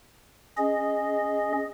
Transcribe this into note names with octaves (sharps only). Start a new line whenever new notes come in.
C#4 G#4 D#5